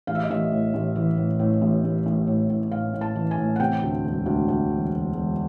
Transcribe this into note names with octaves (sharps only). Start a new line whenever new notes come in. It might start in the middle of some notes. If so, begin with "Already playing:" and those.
A1 F5
E5
D#5
A1 E5
A2
A1
E3
A2
A2
A1
A1
A1
A2
A2
A2 F5
A2
A5
E3
G#5
A2
F#5
C3 G5
D2
E1
D2
D2
E1
E1
E1